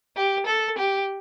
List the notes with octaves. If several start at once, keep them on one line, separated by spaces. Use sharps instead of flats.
G4
A4
G4